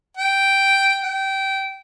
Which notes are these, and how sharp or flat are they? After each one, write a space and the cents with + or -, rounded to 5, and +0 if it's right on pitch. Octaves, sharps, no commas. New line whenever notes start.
G5 -5
G5 -20